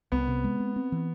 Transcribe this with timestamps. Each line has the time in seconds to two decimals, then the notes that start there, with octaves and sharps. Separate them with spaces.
0.12 C2 B3
0.28 C3
0.44 G#3
0.60 C4
0.76 C4
0.92 E3